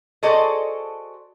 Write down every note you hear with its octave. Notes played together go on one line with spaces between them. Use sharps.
F#4 G#4 A4 C5 D5 D#5